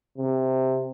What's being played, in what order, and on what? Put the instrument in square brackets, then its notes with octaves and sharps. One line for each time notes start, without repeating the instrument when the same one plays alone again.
[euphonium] C3